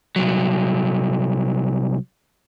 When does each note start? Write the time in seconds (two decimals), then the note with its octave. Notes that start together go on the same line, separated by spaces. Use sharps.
0.16 C2 F#3